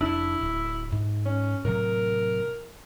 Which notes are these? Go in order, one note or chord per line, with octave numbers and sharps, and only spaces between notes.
F1 D4 E4
D1
G#2
C#4
A2 C3 F#3 A#4